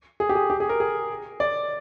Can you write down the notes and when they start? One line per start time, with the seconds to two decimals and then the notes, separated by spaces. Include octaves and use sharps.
0.20 G#4
0.29 G4
0.35 G#4
0.50 G4
0.60 G#4
0.69 A#4
0.80 G#4
1.40 D5